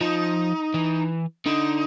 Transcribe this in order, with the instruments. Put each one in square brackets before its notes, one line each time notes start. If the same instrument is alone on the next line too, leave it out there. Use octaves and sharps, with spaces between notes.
[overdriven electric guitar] F3 [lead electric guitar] D#4
[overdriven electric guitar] E3
[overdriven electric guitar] D3 [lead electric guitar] D#4